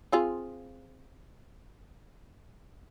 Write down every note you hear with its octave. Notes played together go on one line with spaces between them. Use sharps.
C4 F4 G#4